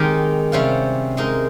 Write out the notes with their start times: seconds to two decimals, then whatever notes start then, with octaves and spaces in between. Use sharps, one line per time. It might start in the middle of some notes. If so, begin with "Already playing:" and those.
Already playing: D#3 G#3 C4 D#4 G4 A#4
0.52 C3 G3 C#4 F4 C5
1.17 G#3 D#4 A#4